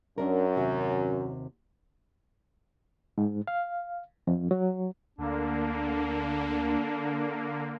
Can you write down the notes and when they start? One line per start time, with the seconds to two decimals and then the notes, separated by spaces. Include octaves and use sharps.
0.18 F#2 C#4 D4 A#4
0.56 D#2 C3 F#4
3.18 G#2
3.48 F5
4.27 F2
4.51 F#3
5.18 D2 D3 A#3 D4